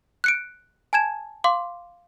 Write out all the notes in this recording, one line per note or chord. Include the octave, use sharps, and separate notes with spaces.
F#6 C#7 D7
G#5 A5 G#6 E7
F5 C6 D6